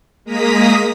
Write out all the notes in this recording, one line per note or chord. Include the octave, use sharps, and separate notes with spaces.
G#3 A#3 A#5 D#6 B6